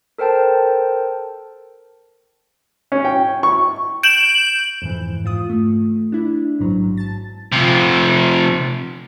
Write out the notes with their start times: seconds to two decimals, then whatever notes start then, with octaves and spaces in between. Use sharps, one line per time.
0.18 A4 A#4 C5 G5 A5
2.92 C#4
3.05 G5
3.43 C#6
4.03 G6 D7 E7 F#7
4.82 F2 G#2 E3
5.25 G#2 F4 D#6
5.50 A3
6.12 D4 E4
6.59 A1 G#2 F#3
6.97 A5 A6
7.52 C3 F3